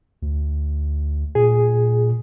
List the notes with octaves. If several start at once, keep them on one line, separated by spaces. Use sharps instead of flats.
D2
A#2 G#4